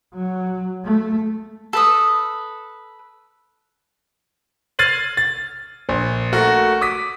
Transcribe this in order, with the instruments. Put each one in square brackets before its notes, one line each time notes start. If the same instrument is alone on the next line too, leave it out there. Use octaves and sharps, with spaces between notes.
[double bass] F#3
A3
[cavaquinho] A4 B4 D#6
[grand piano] F6 G#6 A6 C7 D#7 F#7
A6
A#1
A3 F#4 A#4
D6 D#6 B6